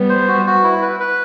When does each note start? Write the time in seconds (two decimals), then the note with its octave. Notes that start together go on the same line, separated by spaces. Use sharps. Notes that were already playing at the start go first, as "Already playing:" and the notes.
Already playing: G3 B3
0.09 C5
0.28 F#4
0.46 F#4
0.64 E4
0.82 B4
1.00 B4